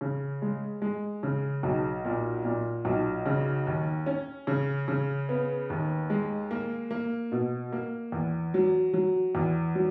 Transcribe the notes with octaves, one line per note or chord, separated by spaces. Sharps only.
C#3
G#3
G#3
C#3
B1
A#2
A#2
B1
C#3
D#2
C#4
C#3
C#3
B3
D#2
G#3
A#3
A#3
B2
A#3
E2
F#3
F#3
E2
F#3